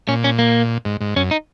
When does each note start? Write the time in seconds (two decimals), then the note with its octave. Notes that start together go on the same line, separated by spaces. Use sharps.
0.09 A#2 C#4
0.24 C#4
0.39 A#3
0.85 G#2
1.01 G#2
1.16 F#2 C#4
1.31 D#4